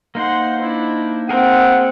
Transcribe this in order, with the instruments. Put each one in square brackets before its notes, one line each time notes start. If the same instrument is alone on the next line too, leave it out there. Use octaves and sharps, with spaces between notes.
[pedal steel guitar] A#3 D#4 C5 [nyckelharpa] F#5 C6
[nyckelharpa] D4 E4
[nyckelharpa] A#3 C4 [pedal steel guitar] G#4 A#4 C5 [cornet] F#5